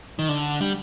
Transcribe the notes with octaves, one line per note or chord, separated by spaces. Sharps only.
D#3
D3
G3